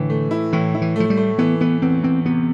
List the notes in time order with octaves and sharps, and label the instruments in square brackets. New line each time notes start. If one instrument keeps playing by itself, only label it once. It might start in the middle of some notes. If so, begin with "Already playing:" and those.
Already playing: [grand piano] A2 E3 [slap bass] D3
[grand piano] A3
E4
[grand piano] A2 [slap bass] E3
[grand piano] E4
[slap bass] E3
[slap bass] F3 [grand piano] A3
[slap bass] G3
[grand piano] A3
[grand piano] E3 [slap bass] B3
[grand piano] E3 [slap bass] B3
[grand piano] E2 [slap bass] C4
[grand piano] E2 [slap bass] C4
[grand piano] C3 [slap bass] B3